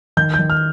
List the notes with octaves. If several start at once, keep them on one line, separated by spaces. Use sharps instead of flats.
D#3 G6
G6
D#3
F6